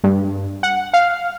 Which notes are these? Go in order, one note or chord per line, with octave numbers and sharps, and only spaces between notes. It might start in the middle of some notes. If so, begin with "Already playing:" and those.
G2
F#5
F5